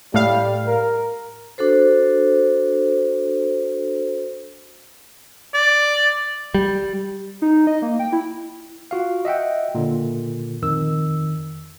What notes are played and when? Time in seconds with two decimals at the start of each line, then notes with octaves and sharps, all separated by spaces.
0.14 A2 G3 F5
0.67 A#4
1.58 D4 F#4 A4 C5
5.54 D5
6.54 G3
7.42 D#4
7.67 D#5
7.82 A#3
7.99 G5
8.13 E4
8.91 F4 F#4 F5
9.25 D#5 E5 F#5 G5
9.75 A#2 D3
10.62 F2 D#3 E6